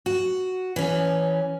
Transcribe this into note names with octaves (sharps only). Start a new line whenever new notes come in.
F#4
E3 C#4